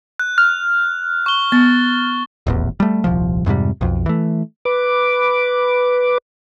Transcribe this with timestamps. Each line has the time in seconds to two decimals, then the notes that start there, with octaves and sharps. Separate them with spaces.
0.19 F#6
0.38 F6 F#6
1.26 C#6 G7
1.52 B3 A6
2.47 D#1 A1 E2
2.80 G3 A3
3.04 D#1 C2 F3
3.46 F2 G#2 C3 G3
3.81 B1 F2
4.06 E3 A3
4.65 B4 D6